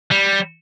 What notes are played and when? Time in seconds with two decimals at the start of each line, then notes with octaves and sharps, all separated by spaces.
0.11 G3